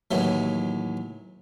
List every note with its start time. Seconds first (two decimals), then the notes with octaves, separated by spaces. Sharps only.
0.11 D#2 A2 E3 F#3